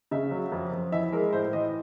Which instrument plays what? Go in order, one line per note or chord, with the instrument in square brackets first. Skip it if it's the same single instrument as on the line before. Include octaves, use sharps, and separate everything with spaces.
[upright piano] C#3 E5
F#3
F2
F2
E3 E5
G#3 A#4
A2 C5
E3 D#5